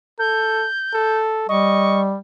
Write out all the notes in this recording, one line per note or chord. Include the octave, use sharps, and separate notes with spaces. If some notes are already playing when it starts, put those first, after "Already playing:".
A4 G6
A4
G3 D#5 C#6